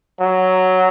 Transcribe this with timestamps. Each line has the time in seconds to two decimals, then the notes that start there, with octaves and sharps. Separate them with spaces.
0.21 F#3